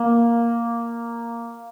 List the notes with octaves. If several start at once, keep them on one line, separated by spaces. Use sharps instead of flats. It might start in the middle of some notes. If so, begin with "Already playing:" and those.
Already playing: A#3